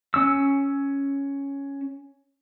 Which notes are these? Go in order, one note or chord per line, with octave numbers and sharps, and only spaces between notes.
C#4 E6